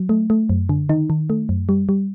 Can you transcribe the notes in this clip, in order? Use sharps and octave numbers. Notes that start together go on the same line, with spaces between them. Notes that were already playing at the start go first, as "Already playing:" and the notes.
Already playing: F#3
A3
A3
F#2
D3
D#3 D#4
D#3
A3
F#2
G3
G3